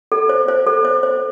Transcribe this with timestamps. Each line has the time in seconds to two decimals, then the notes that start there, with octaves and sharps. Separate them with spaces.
0.12 A4
0.29 C5
0.48 C5
0.67 A4
0.85 C5
1.03 C5